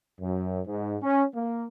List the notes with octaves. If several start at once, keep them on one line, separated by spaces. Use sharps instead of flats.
F#2
G#2
C#4
A#3